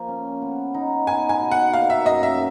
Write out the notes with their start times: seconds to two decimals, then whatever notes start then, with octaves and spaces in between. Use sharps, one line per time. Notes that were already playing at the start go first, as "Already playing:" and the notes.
Already playing: F3 A#3
0.08 C#4
0.42 B3
0.74 D#4
1.07 B3 G#5
1.29 G#5
1.40 B2
1.51 F#5
1.73 A#3 F5
1.90 E5
2.06 F#2 D#5
2.23 E5